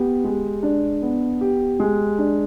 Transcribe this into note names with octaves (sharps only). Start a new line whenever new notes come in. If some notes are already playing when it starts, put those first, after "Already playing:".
Already playing: B3 G4
G#3
D4
B3
G4
G#3
D4